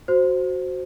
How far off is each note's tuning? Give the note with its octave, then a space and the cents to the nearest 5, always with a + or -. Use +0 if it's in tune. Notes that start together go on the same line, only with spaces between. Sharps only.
F#4 +0 C5 +0